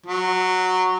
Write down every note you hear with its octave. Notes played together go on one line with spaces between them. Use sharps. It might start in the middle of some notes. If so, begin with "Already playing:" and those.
F#3